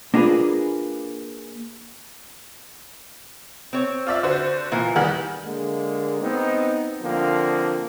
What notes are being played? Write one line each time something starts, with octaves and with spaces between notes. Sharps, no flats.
A#3 D4 F4 G#4 B4
C4 C#5
F4 D5 E5
D3 F#4 C5
A#2 E3
D#3 E3 G3 F#5
D3 G#3 A#3
B3 C4 D#4
D3 F3 A#3 C4